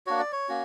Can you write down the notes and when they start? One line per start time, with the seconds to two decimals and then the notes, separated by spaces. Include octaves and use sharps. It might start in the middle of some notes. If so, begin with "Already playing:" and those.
0.07 A#3 D4 F#4 C#5
0.19 D5
0.32 C#5
0.49 A#3 C#4 F#4